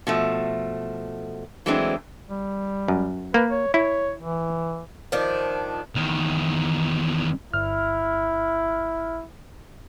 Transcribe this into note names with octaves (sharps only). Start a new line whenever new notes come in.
B2 F3 A3
E3 F#3 G#3 A3 C4 D4
G3
F#2
A#3 B4
C#5
E4 C#5
E3
D#3 F3 D4
E2 D#3
G1 E4 F6